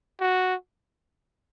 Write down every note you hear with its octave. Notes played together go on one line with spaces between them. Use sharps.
F#4